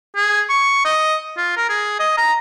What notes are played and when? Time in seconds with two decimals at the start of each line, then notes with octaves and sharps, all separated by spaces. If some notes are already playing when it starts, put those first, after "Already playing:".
0.16 G#4
0.49 C#6
0.85 D#5
1.37 F4
1.57 A#4
1.69 G#4
2.00 D#5
2.17 A#5